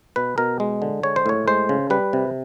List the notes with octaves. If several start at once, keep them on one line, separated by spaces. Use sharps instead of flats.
B2 B4
B2 A#4
G#3
D3
G#3 C#5
C5
A2 C#5
G#3 C5
C#3
G3 B4
C3